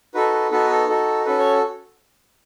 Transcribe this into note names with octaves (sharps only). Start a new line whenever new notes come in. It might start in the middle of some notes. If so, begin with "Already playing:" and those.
D#4 F#4 A4 B4
B4
B3 D#4 F#4 A4 B4
A4
D#4 F#4 A4
C#4 F#4 A4 B4
C#5